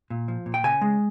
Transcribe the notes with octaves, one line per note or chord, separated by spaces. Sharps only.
A#2
F3
A#2
G5
C#3 G#5
G#3